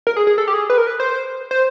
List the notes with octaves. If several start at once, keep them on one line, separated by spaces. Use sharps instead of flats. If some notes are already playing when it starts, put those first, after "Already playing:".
A#4
G#4
G#4
A4
G4
G#4
B4
A#4
B4
C5
C5